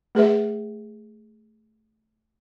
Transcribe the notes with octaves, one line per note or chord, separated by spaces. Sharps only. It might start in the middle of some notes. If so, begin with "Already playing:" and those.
A3 G#4 B4 E5